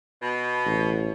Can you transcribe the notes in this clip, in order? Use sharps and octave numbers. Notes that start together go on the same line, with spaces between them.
B2
A1